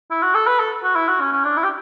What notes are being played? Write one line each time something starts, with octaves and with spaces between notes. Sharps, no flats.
E4
F#4
A4
B4
A4
F#4
E4
F#4
C#4
C#4
D4
E4
G4